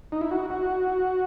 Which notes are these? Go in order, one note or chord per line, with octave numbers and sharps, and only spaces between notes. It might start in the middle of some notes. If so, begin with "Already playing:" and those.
D#4
E4
F#4
F#4